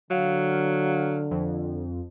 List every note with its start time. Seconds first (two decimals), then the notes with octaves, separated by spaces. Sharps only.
0.11 D3 F#3 F5
1.31 F2